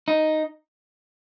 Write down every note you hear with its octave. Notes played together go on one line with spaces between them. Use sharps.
D#4